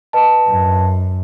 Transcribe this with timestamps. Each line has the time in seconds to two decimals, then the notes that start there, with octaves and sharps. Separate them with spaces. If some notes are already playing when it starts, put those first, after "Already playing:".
0.13 B4 D#5 A5
0.47 F#2